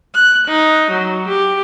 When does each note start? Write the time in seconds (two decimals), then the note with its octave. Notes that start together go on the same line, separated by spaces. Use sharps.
0.13 F#6
0.47 D#4
0.91 F#3
1.28 G4